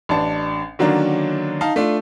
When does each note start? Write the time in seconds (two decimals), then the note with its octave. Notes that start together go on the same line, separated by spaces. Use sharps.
0.09 A1 D4 A5
0.79 D3 D#3 F#3 A#3 C#4 D4
1.61 D#4 F5 A5
1.76 A3 D4 F4